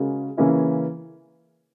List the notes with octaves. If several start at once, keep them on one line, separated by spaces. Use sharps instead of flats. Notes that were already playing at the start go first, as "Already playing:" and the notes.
Already playing: C#3 G#3 C#4 F#4 A#4
C#3 E3 A#3 C#4 E4